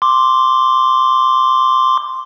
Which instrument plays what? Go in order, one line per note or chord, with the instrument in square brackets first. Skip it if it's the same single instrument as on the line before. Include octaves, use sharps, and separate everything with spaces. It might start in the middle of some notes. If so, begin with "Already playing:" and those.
[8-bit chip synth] C6 D6